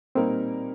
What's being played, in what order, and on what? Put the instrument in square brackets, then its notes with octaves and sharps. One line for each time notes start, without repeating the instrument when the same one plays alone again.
[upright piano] A#2 G3 A#3 D#4 A#4 [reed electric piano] C4